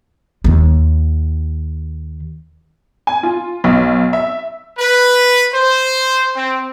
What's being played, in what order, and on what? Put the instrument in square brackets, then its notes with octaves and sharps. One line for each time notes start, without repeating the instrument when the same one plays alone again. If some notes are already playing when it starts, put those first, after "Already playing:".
[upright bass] D#2 D#3
[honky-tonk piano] G#5
F4
B1
E5
[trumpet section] B4
C5
C4